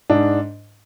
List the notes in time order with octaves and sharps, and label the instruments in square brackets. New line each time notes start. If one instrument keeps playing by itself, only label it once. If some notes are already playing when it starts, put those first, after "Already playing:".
[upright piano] G#2 D4